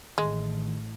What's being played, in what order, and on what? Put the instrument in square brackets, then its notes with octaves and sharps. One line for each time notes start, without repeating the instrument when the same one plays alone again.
[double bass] A1 A2 [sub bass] D#3 [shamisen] G#3